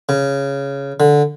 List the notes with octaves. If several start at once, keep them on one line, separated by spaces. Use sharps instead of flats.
C#3
D3